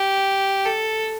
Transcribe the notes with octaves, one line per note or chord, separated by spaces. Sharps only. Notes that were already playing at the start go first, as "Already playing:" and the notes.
Already playing: G4
A4